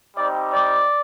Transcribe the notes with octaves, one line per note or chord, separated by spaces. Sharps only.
G3 C4 D#4 G4 D5
D5